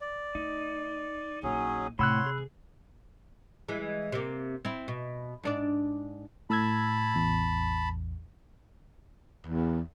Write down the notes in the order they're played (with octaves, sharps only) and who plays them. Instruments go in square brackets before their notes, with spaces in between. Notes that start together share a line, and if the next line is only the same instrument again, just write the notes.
[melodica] D5
[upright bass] A3 [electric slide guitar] D#4
[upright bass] A#1 [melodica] F#3 C#4 G#4
[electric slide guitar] A2 F#5 [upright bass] C3 [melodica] C#5 C6 [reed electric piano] B5 E6 F#6
[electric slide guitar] G#4
[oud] E3 G#3
C3 A#3
C4 E4
B2
G#2 D4 D5
[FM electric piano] A2 E6 G#6 [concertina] A5 B5
[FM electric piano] A1 E2
[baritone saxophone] E2